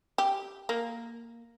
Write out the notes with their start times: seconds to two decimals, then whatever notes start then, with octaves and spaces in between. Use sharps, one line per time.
0.18 G4
0.69 A#3